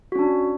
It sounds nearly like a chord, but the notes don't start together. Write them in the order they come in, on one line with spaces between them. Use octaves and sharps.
F#4 C#4 D4